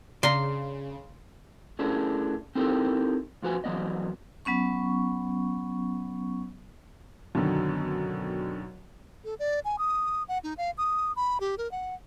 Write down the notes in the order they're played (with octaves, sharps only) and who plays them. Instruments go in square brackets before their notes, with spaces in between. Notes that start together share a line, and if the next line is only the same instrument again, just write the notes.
[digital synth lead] C#3 [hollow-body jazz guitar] D5 F5 A#5 [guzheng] C6
[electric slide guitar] A3 C#4 D4 E4 G#4 A#4
C4 D#4 E4 G4 A4 A#4
F2 F3 F#4 B4 G#5
F#2 E3 F#3 B3 D5 D#5
[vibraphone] F#3 B3 C#4 C#6
[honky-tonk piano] F#2 B2 D3 D#3
[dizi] A4
D5
G#5
D#6
F#5
D#4
F5
D#6
B5
G4
A#4
F#5